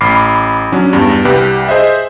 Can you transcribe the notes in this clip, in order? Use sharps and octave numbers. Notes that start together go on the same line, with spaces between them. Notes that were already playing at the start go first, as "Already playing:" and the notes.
A1 B5 D6 F6 C7
F#3 C#4 D4
E2 G2
C2 G4 B4
G#4 C5 D#5 E5